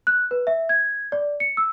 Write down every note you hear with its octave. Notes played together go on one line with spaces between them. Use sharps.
F#6
B4
E5
G#6
D5
C#7
E6